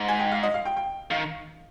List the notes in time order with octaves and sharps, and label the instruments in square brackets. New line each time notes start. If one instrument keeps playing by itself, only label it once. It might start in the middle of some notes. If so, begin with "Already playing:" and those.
Already playing: [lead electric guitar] G#2
[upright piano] G#5
G5
F5
D#5
F5
G5
G5
[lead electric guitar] D#3 [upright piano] F5